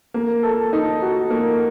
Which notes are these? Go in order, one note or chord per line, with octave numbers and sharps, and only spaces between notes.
A#3
A4
D#4
F#4
A#3